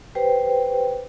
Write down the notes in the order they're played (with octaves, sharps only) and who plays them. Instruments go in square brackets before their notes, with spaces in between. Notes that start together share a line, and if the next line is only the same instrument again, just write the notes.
[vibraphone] G4 B4 C5 G5